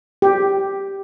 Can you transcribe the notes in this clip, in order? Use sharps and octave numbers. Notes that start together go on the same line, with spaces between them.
G4